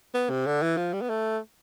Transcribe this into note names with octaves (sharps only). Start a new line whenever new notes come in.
B3
C3
D3
E3
F3
G3
B3
A3